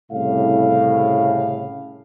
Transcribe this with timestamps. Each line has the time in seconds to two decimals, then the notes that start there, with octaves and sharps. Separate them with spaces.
0.12 C2 A2 C#3 F5